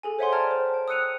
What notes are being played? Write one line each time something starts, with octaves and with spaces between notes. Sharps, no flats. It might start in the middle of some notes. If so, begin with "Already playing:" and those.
G#4 A4 G#5
C5 C#5 E5 F#5 G#5 C6
D5 G5 A5 A#5 F6 G#6
C5
G5 A5
D#6 E6 F#6 C#7 D#7 F7